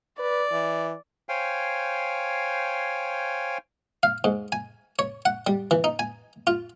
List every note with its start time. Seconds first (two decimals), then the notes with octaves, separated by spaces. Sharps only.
0.19 B4 D5
0.52 E3
1.29 C5 C#5 F5 G5 G#5
4.03 F5
4.24 G#2
4.52 G#5
4.99 C#5
5.25 F#5
5.47 G3
5.71 E3
5.84 D#4
5.99 G#5
6.47 F4